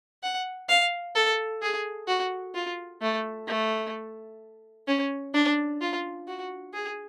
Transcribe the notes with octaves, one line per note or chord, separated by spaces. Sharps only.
F#5
F5
A4
G#4
F#4
F4
A3
A3
C#4
D4
F4
F#4
G#4